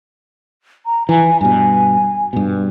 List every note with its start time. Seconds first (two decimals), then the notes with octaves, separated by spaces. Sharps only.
0.86 A#5
1.09 E3 G#5
1.41 G2 B2 G#5
2.33 G2 B2